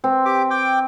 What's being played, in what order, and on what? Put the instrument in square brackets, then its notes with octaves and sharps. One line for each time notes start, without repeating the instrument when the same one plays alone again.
[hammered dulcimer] C4
[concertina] G4 D6
G5 D6